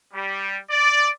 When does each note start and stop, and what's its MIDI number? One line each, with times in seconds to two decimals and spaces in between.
0.13 0.59 55
0.70 1.09 74